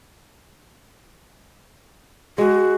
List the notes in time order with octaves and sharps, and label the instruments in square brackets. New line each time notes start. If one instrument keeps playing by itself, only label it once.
[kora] G#3 [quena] F#4